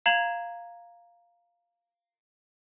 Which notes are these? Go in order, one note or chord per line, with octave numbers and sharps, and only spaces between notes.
F5 A#5 G#6 E7 F#7